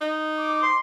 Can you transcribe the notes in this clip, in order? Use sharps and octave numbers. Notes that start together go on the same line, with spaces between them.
D#4
D6
C6